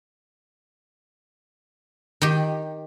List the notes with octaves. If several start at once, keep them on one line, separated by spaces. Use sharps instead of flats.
D#3 G4